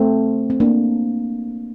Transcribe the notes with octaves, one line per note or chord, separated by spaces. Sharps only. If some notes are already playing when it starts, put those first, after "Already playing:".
Already playing: A3 C4
C4
A#3 D4